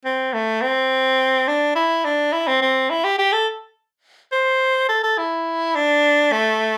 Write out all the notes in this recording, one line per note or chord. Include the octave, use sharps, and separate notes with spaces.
C4
A3
C4
D4
E4
D4
E4
C4
C4
E4
G4
G4
A4
C5
A4
A4
E4
D4
A3